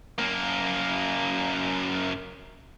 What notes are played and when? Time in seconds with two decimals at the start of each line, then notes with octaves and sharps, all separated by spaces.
0.19 F#2 A#3